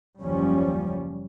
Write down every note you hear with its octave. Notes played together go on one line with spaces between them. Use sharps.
F#1 D#2 F3 G3 C#4